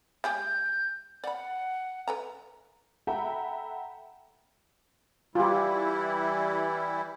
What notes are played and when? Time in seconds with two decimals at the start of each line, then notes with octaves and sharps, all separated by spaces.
0.24 G#3 G4 G#4 G6
1.24 D5 F#5 B5
2.08 A4 B4 A#5
3.07 A4 E5 F#5 G5 A#5 B5
5.35 E3 G3 E4 F4 G4